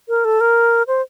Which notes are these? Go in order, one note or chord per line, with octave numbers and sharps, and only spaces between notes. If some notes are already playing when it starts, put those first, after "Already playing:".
A#4
A4
A#4
C5